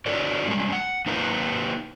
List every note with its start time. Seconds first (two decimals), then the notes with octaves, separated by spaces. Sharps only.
0.06 D3 F#4 A4 A#4 D5
0.47 G3 G#3 C#4
0.72 F#5
1.06 A#3 C4 D#4 A#4 B4 F5